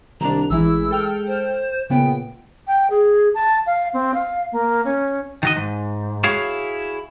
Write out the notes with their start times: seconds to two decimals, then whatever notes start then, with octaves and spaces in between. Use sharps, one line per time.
0.21 C2 D#3 D4 A#5
0.50 A1 E3 G#3 E4 E6
0.91 A4 G5 F6
1.27 C5
1.90 A#2 C#3 B3 G5
2.67 G5
2.90 G#4
3.35 A5
3.66 F5
3.94 C4
4.14 F5
4.52 A#3
4.85 C#4
5.43 D#3 F#4 D#5
5.56 G#2
6.24 E4 F#4 G#4 C#5 F5